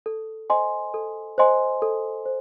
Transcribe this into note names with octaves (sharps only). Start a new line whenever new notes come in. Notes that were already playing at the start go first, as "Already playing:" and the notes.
A4
C5 D#5 G#5 C6
A4
C5 D#5 G#5 C6
A4
C5